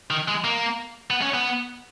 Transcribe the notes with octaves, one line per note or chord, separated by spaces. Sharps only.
D#3
G#3
A#3
B3
C#4
B3